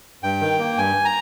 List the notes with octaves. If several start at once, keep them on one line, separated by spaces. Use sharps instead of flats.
G2 G5
D#3
A#3
G2 G#5
A#5